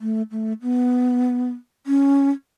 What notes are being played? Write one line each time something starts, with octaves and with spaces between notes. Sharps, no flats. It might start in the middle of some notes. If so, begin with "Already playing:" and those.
A3
A3
B3
C#4